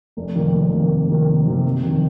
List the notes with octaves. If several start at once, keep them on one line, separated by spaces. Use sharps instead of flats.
F1
F2 C3 D#3 A#3
F1
F2 C3 D#3 A#3
F1
F2 C3 D#3 A#3
F1
F2 C3 D#3 A#3
F2
C3 D#3